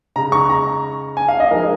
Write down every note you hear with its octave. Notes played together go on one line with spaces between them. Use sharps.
C#3 G#3 D#4 A#5
C#6
A#5
G#5
F5
D#5
F3 G#3 D#4 A#4